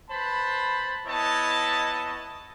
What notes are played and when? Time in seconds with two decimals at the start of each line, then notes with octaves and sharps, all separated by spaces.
0.10 B4 C5 A5 B5
1.07 B3 E4 C#5 D#5 A5